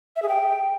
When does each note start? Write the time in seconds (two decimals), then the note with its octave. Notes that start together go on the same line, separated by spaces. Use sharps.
0.16 E5
0.22 G#4
0.29 G5